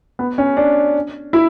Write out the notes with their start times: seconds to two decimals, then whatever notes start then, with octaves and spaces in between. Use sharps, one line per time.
0.19 B3
0.38 C#4
0.57 D4
1.33 E4